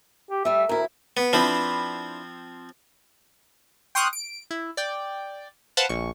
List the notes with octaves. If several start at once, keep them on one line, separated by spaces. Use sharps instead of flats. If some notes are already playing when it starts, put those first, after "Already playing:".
G4
G3 A3 E5
D2 E4 A#4
B3
F3 C4 D4 E4 B4
G5 C6 C#6 D#6 F6 F#6
D7
E4
D5 G5
B4 C5 F5 F#5 A5
A#1 C#6